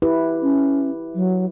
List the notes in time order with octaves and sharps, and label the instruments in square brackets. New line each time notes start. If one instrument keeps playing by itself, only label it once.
[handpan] E4 G4 B4
[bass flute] C#4
F#3